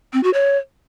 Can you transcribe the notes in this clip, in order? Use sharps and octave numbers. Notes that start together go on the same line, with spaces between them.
C4
F#4
C#5